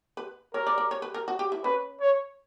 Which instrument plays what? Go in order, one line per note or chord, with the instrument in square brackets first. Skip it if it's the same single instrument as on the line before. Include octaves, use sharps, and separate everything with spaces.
[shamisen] B4
[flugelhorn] A#4 [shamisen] C#5
[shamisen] D5
D5
C#5
B4
A#4
F#4
G4
E4
[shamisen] C#4 [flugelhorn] B4
[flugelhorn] C#5